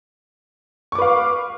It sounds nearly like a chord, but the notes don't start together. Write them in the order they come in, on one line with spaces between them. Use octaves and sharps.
C#6 D6 B4 F5